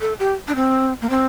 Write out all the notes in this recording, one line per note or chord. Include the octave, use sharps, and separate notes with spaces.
A4
G4
D4
C4
A#3
C4